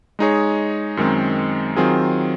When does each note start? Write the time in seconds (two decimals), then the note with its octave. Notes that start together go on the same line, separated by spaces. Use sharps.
0.19 G#3 D#4 G#4 C#5
0.97 F#2 D#3 G#3 C4
1.76 D#3 F#3 C4 F4 G#4